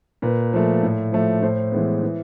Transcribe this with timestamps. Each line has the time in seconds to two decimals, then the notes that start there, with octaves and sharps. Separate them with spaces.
0.22 A#2 B4
0.53 F3 A3
0.83 A2
1.12 F3 A3
1.42 A2 C5
1.72 E3 G#3 B3
2.02 E3